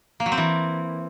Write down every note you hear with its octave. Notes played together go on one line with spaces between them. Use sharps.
A#3
F#3
C4
E3